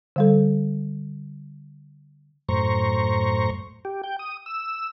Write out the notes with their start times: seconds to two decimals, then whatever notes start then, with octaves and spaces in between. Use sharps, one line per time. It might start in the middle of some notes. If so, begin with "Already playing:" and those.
0.16 D3 G3 A4
2.49 F#2 A2 C5 A#5 C#6
3.85 G4
4.04 G5
4.19 D#6
4.46 E6